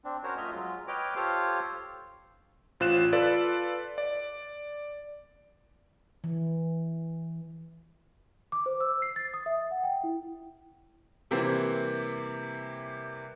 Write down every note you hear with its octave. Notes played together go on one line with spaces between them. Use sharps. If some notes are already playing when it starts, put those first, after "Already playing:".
C4 D4
C#4 F#4 A#4 C5 C#5
F2 A3 F4 D#5 E5 F6
F#3 G#3 F4
B4 C#5 D#5 G5 D6 F6
F4 G4 A4 C5 C#5 F5
A1 F4 C5 F#6 E7
F4 A4 B4 D5
D5
E3
D6
C5
E6
C7
A6
D#6
E5
F#5
G5
E4
C3 E3 G3 A#3 C4